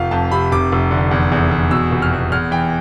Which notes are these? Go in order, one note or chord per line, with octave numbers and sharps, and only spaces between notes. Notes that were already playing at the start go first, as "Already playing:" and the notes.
Already playing: F1 F3 F5
F2 A5
C3 B5
F1 D6
F1
D3
E2
E2
E2
B2 E6
F1
F6
E2
E2 F6
E3 G5